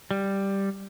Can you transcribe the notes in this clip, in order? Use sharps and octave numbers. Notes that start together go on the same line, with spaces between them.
G3